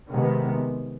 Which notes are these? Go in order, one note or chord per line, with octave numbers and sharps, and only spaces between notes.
C3 D#3 G#3 B3